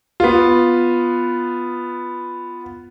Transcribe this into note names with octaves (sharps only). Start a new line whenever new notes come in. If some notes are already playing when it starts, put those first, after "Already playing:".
B3 F4